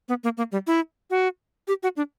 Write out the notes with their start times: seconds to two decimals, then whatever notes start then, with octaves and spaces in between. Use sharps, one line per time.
0.09 B3
0.24 A#3
0.37 A#3
0.52 G3
0.67 E4
1.10 F#4
1.68 G4
1.83 F#4
1.97 D4